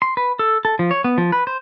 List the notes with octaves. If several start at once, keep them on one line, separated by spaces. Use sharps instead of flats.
C6
B4
A4
A4
F3
C#5
B3
F3
B4
C5